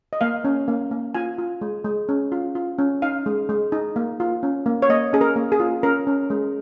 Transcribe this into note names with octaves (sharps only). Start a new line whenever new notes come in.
D#5
A#3 F5
C#4
A#3
A#3
F4 G#5
F4
G#3
G#3
C#4
F4
F4
C#4
D#4 F5
G#3
G#3
D#4
A#3
F4
C#4
A#3
C#5
A#3 D#5
C#4 G#4
A#4
A#3
G#4
F4
C#4 A#4
C#4
G#3